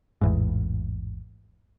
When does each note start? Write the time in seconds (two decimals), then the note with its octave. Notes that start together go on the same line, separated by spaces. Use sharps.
0.21 A1 E2 G#2